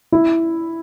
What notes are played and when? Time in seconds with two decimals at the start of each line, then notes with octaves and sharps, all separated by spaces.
0.12 E4